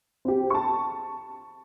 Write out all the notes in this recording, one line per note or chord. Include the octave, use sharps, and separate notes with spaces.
C4 G4
A5 C#6